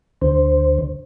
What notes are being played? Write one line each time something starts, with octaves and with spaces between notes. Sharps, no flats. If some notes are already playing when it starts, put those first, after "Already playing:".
D2 D3 C5